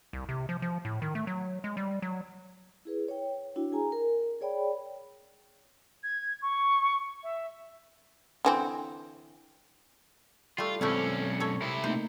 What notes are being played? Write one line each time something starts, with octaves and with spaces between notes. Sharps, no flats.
C2
C3
F3
F3
A2
D#3
A3
F#3
G#3
G3
F#3
E4 G#4 B4
C#5 G5
D4 E4 F#4 G5
G#4 G#5 A#5
A#4
G#4 C#5 D5 G5 B5
G#6
C#6
E5
D3 E3 C4
G3 A3 F4
B1 G#3 A3 C4 C#4 E4 D5 F5
A4 C#5
C3 E4
A3 A#3 D#4 C5